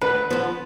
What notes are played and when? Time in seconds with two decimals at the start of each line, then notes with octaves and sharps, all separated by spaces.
0.01 D2 B4
0.30 D3 F3 B3